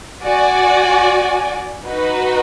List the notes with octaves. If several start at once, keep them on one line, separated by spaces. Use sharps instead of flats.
F#4 D5 G#5
D#4 F#4 B4